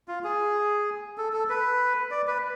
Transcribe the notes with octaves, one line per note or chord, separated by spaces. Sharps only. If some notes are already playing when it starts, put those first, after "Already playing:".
F4
G#4
A4
A4
B4
D5
B4